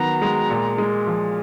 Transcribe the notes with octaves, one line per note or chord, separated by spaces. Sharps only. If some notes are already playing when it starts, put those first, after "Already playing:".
Already playing: D#3 F#3 B3 A#5
G#3
A#2
G#3
F3